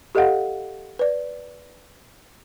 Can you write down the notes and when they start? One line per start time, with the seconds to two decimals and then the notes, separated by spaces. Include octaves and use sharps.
0.15 G4 A4 D#5 F5 F#5
0.99 B4 D5